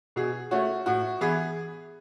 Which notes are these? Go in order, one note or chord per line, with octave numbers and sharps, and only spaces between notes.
B2 G#4
A3 C#4 F#4
A2 F#4
E3 B3 G#4